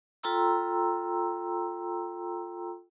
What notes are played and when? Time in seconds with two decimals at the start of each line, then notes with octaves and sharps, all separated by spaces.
0.23 F4 A4 G5 A#5 C6 E6